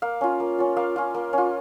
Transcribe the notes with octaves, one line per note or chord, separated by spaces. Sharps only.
A#3 F5
C#4 F4
A#3
C#4 F4
A#3 F5
C#4 F4
A#3
C#4 F4